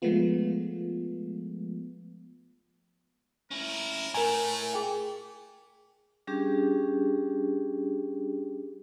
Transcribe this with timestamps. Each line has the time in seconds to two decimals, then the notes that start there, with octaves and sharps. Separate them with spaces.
0.02 F3 G#3 A3 B3 F4
3.51 C#4 E4 A#4
4.14 A2 A3 A#4 G#5 A#5
4.73 G#4 G5
6.27 G3 C#4 D4 G4 G#4